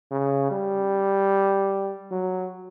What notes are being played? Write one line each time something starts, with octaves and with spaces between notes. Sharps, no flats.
C#3
G3
F#3